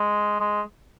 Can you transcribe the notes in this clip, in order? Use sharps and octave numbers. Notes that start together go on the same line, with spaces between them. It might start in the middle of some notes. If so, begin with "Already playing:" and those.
Already playing: G#3
G#3